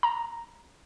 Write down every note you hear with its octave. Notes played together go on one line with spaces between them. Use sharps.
A#5